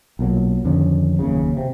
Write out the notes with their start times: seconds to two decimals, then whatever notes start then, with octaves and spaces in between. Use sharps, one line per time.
0.19 B1 A#2 F#3
0.65 F2 D3 D#3 C#4
1.19 F#1 D#2 C#3
1.57 C3